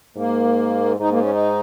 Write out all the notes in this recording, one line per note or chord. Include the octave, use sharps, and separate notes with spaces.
G#2 A#3
G#2 D#4
A#3
C#4
D#4